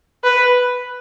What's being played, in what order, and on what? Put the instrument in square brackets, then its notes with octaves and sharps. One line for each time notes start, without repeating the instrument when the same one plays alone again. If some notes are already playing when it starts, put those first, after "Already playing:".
[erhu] B4